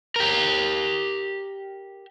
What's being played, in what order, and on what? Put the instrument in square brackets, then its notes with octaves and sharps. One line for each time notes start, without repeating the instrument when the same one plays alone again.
[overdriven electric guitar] G4 A#4